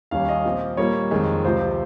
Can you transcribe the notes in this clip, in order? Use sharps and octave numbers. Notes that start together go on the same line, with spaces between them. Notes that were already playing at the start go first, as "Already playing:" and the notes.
D#2 D#3 G3 C#4 F5
D#5
A#2 F3 C4
A#2 G3 A#3 C#5
F2 D#3 G#3
C#2 C3 F3 C5